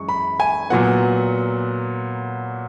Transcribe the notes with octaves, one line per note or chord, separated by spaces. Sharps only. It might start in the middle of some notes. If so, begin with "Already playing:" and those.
Already playing: F#2 E3 G#3 C#6
B5
G#5
A#2 F#3 B3 F#5